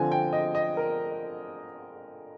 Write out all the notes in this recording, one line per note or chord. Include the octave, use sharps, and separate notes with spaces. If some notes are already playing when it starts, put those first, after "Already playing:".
Already playing: D3 F3 C4 G#5
G5
D#5
D#5
A#4